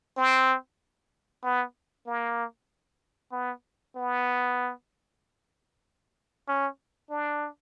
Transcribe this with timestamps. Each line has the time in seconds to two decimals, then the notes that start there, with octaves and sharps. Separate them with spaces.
0.18 C4
1.44 B3
2.07 A#3
3.32 B3
3.96 B3
6.48 C#4
7.10 D4